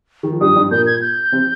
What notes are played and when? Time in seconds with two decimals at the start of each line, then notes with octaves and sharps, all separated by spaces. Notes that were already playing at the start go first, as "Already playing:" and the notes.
0.23 D#3
0.32 F3
0.41 G2 G3 D#6
0.56 G2 G3
0.71 A#2 A#3 G6
0.86 G#6
1.02 G6
1.32 C3 C4